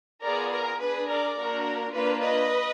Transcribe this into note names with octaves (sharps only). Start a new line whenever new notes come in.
B3 F4 G#4 A#4 D5
A#4
D4 G#4 B4
A#4 D5
A#3 D4 F#4 A#4
A#3 D4 F4 B4
B4 D#5